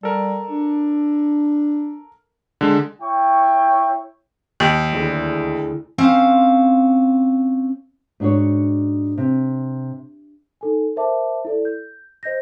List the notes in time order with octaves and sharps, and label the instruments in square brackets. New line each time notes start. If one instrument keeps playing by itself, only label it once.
[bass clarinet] G3 [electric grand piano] A4 A#4
[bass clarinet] D4
[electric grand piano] D3 G#3
[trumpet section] E4 C#5 G5 C#6
[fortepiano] D#2
[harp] D2 E4 G#4
[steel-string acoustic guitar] C4 C#4 C5 F5
[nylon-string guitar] G#2 D4 F#4 C#5
C3
[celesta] D#4 A4 G#5
A#4 C5 E5 A5 D6
E4 A4 D5
G6
C5 D#5 G6 A#6